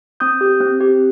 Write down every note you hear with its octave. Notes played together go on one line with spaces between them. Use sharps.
C4 D#6 G6
G4
C4
G4